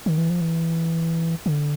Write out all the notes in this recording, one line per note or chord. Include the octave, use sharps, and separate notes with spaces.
D#3
E3
F3
E3
D3